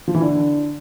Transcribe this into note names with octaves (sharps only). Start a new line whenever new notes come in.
F3
E3
D3